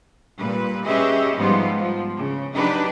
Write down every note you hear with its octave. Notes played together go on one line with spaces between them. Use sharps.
A#2 G3 B4
C#4 G4 G#4 B4 D#5 E5
G#2 F3 G3 B3 D#4 F4
F3
C#3
F#3 D4 D#4 G4 B4